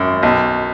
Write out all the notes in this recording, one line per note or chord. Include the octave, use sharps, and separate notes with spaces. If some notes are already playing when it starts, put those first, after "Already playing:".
Already playing: G#1 F#2
B1